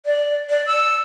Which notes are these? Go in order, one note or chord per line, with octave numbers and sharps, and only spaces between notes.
D5
D5
E6